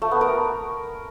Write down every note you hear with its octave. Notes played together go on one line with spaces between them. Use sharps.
A3
B3
A#4